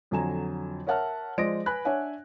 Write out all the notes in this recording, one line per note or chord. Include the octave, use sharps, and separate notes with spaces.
F2 D3 F#3 G#5 A#5 E7
A#4 C#5 E5 F#5 A5 F6
F3 G#3 C5 D5 A#6 D7
B4 G#5 B5 F#6
D4 C#5 E5 F#5 G#5